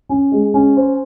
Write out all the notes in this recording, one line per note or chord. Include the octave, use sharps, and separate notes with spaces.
C#4
G#3
C#4
C5